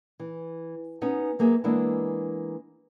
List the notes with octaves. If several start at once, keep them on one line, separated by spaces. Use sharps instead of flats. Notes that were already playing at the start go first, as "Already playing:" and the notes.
E3
B3 C#4 D#4 F#4
F#3 A#3 B3 G#4 E5
E3 G#3 A#3 B3 D4 E4